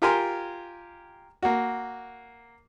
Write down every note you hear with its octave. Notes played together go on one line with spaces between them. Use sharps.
F4 G4 A#4 G#5 C6
A#3 F#4